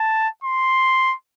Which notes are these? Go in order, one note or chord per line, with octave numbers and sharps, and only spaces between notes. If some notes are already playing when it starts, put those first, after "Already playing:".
Already playing: A5
C6